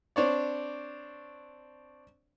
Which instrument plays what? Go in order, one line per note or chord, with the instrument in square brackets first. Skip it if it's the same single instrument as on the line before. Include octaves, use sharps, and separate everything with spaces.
[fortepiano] C4 D4 C#5 D5